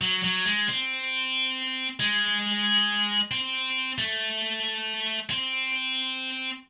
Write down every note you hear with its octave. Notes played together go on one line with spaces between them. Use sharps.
F#3
F#3
G#3
C4
G#3
C4
A3
C4